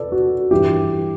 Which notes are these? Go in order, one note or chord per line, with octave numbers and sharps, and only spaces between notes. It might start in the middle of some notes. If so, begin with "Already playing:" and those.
Already playing: A4 B4 D5
F#4
G2 E3 G4